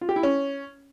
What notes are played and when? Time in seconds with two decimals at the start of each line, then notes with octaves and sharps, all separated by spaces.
0.01 F4
0.09 G4
0.16 E4
0.23 C#4